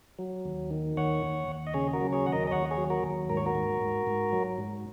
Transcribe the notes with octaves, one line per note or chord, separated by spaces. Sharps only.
F#3
D#2
D#3
D#2 C#5 F#5
D#2
D#2
D#5
C#3 G#4 C#5
F#4 A#4
F#3
G#4 C#5
D#2 F#5
A#4 D#5
D#5
D#2 C#5 F#5
G#4 C#5
F#3
F#4 A#4
D#2
G#2 A#4
C#5
F#4 A#4
G#2
G#2
G#2
F#3
G#2